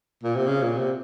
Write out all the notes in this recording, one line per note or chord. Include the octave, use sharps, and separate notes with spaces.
A#2
C3
C#3
A#2
C3